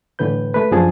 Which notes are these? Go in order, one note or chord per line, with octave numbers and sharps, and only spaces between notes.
A2 D3 E3 B4 G6
A3 B4
F#2 F3 D4 G#4 A5